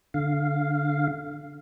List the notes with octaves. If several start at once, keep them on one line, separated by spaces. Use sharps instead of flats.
D3 F5